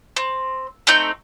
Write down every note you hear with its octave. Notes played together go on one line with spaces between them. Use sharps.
C4
A3 C4 D#4 G6